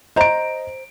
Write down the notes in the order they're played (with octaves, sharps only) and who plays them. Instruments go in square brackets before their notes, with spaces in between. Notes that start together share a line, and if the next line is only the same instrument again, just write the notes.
[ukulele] C5 A#5 [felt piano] D#5 D7